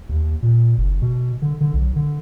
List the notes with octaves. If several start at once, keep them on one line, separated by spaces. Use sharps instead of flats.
D#2
A#2
F#1
B2
D3
D3
B1
D3